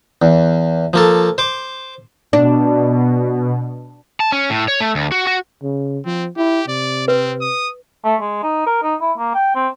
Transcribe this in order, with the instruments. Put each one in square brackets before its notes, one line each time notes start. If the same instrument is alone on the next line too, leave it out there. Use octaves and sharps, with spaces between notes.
[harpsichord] E2
F3 A#3 A4
C5 D6
[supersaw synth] B2 [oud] D4
[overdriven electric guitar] A5
C#4
A2
C#5
A3
D2
F#4
F#4
[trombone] C#3
[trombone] F3 [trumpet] C4
[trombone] E4 [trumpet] G4
[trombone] C3 [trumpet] D5
[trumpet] C4 [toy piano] B4
[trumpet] D#6
[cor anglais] A3
G#3
D#4
A#4
D#4
E4
A#3
G5
C4